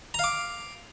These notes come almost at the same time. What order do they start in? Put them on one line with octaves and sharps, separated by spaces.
A#5 F5 D6